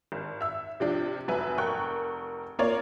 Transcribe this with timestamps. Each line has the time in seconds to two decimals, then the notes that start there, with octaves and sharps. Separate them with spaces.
0.12 G#1
0.41 E5 E6
0.80 C3 F3 D4
1.28 F1 F#2 B4 E5 G#5
1.58 F1 A#4 G5 C#6 F#6
2.59 A#3 F4 A#4 C#5 D5